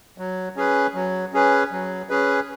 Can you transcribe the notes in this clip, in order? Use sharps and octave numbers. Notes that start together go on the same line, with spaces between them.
F#3
C#4 G#4 B4
F#3
C#4 G#4 B4
F#3
C#4 G#4 B4